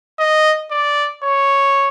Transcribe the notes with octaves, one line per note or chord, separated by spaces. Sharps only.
D#5
D5
C#5